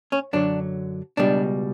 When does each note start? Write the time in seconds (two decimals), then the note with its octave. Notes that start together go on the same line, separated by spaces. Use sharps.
0.12 C#4
0.33 F#2 D3 F#3 D4
1.17 C#2 B2 G3 D4